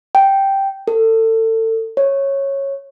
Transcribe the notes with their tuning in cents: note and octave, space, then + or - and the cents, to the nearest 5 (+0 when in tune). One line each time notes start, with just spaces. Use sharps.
G5 -5
A4 +30
C#5 -10